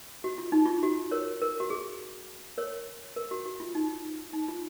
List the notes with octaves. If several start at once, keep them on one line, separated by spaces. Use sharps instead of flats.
F#4
F4
D#4
F4
F#4
A#4 C#5
A#4
F#4
G#4
A#4 C#5
A#4
F#4
F#4
F4
D#4
D#4
F4